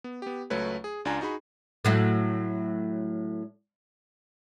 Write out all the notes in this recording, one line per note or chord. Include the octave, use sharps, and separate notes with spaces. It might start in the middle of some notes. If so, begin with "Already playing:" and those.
B3
B3 G4
C#2 F#3 A3 B4 C#5
G#4
C#2 D4 F4 G#5 A#5
D#4 F#4 G#4 B5
A2 F#3 A3